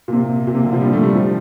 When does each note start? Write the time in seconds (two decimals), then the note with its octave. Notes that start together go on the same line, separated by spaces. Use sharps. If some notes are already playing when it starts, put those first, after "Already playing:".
0.08 A#2
0.13 C3
0.47 A#2
0.55 C3
0.65 D3
0.73 F3
0.81 G3
0.93 A3
1.03 G3
1.15 F3